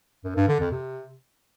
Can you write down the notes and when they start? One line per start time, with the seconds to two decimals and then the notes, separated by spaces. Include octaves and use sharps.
0.24 F#2
0.36 G2
0.48 D3
0.60 F2
0.72 C3